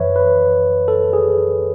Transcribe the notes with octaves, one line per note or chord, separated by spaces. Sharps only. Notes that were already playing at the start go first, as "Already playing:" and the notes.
Already playing: F#2 E3 B4 C#5 E5
B4
A4
G#4